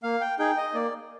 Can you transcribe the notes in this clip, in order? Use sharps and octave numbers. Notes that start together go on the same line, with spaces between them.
A#3 F5
G5
D#4 G#4 G5
D#5
A#3 D5